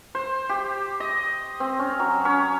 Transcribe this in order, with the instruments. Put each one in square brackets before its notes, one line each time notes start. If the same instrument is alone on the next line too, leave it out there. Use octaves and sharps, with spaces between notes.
[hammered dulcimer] C5
G4
D#5
C4
C#4
F#3
C#4